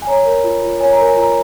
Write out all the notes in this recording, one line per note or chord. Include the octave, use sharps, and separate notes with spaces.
G#5
C#5 A#5
A#4
F4
F4
C#5 G#5
A#5
A#4
G#5
F4 A#5